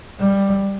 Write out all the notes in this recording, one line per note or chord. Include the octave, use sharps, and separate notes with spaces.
G3